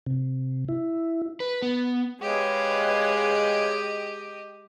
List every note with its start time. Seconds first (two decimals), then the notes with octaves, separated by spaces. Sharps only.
0.06 C3
0.69 E4
1.40 B4
1.62 B3
2.22 G#3 G4 G#4 B4 C#5 D#5 F5